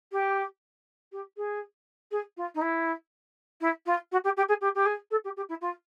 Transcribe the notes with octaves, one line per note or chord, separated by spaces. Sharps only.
G4
G4
G#4
G#4
F4
D#4
E4
E4
F4
F#4
G4
G4
G#4
G4
G4
G#4
A4
G4
G4
E4
F4